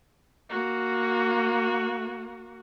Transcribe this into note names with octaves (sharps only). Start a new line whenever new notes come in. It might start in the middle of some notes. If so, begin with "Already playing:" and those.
A#3 F#4